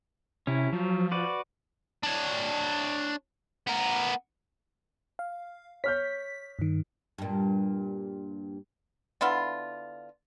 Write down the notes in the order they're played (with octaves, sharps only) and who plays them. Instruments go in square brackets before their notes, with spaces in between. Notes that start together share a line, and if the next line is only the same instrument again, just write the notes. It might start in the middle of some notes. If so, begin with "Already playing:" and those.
[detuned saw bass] C3 [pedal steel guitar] C#4 E4
[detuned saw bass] F3 [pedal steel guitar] F#3
[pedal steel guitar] F#4 B4 D5
[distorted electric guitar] D4 C#5
B3 A#4
[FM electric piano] F5
[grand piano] C#5 F6 G6 [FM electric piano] B6
[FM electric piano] G2 D#3
[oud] G2 A#2
[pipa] D3 B3 E4 F4